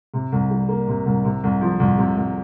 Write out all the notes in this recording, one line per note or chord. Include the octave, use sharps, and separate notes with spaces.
C3
C2
G3
A#3
C3
C2
C3
C2
F3
C2
C3
C2